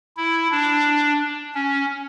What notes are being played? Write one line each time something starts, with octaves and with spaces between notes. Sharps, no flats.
E4
D4
C#4